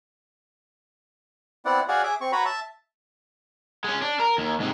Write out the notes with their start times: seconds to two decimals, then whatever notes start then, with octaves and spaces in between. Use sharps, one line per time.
1.65 B3 C4 E4 D5 F#5
1.88 F#4 G#4 C#5 D5 F5 F#5
2.04 G#4 E5 D6
2.21 C4 C#6
2.32 F#4 B4 C#5 A#5 B5
2.45 E5 A5
3.85 G#3 C#4
4.02 D4
4.19 A#4
4.38 D#2
4.60 G#2 C3